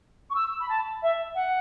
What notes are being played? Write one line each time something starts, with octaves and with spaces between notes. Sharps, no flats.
C#6
E6
B5
A5
E5
F#5